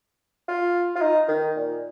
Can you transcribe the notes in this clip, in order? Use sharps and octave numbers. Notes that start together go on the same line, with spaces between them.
F4
F4
D#4
D#3
A#2